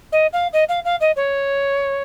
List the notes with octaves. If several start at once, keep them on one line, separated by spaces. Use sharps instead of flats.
D#5
F5
D#5
F5
F5
D#5
C#5